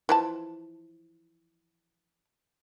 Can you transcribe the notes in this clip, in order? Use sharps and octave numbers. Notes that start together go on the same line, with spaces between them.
E3 F3 A5